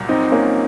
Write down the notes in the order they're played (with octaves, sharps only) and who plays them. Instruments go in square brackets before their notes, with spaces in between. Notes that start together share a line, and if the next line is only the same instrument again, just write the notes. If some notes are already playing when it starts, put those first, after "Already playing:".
Already playing: [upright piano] C2 A#2 F#3
[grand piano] C4 D#4
A#3 C#4